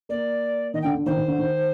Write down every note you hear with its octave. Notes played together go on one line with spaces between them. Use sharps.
A#3 D5
D#3 D#5
G5
D3
D3
D#3 C5
D#3
D3
D#3